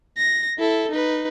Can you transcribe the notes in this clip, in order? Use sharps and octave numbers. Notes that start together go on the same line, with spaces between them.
A#6
E4 A4
D#4 B4